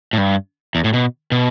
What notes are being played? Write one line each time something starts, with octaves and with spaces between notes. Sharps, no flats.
A2
G2
E2
A2
B2
B2